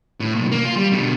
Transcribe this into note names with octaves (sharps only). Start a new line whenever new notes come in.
A2
B1 A#2
A#3
F4
G3
B2 D3